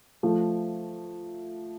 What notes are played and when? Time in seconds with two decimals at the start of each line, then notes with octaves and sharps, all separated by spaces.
0.23 F3 A3